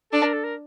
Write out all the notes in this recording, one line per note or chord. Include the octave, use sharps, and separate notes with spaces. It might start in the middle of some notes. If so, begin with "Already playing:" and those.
D4 A4
A#4
A4
A#4